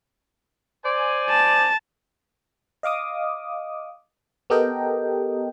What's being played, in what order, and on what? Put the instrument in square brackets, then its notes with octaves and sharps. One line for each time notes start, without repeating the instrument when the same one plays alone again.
[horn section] C5 D5 G#5
[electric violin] A5
[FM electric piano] D#5 F5 D6 D#6
B3 G4 A4 A#4 D#5 G5